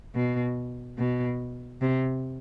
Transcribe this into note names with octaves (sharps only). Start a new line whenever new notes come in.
B2
B2
C3